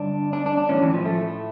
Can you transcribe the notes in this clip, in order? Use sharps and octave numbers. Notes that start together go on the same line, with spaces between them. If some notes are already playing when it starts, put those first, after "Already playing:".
Already playing: G2 D3 D4
D4
D4
D4
A2 E3 C#4
E3
F3
A3